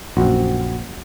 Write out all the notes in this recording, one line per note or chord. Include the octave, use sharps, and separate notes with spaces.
A#1 F#2 C4 F#4